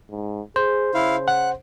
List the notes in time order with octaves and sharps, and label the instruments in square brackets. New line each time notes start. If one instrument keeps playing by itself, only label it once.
[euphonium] G#2
[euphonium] G#4 [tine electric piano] C5
[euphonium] C#3 [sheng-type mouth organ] E4 F5
[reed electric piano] F#5 [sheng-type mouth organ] F#6